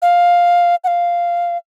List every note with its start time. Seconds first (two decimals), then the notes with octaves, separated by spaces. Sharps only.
0.02 F5
0.84 F#5
0.87 F5